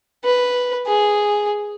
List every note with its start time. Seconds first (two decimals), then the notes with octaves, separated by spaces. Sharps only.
0.25 B4
0.87 G#4